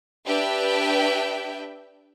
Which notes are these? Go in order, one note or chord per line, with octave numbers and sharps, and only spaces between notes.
D4 G4 B4 E5 G5